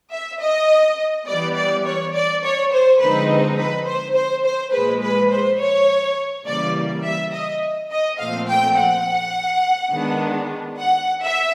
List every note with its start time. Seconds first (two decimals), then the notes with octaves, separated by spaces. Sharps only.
0.12 E5
0.41 D#5
1.27 E3 G3 B3 D5
1.55 D5
1.85 C#5
2.14 D5
2.43 C#5
2.72 C5
3.00 D3 F3 G#3 C4 D#4 B4
3.58 B4
3.87 C5
4.15 C5
4.45 C5
4.73 A#2 F3 G#3 B4
5.02 B4
5.30 C5
5.59 C#5
6.46 C#3 E3 G3 A#3 D5
7.04 E5
7.32 D#5
7.91 D#5
8.19 A#2 F3 A3 C4 F5
8.47 G5
8.77 F#5
9.91 D#3 G#3 B3 D4
10.78 F#5
11.22 E5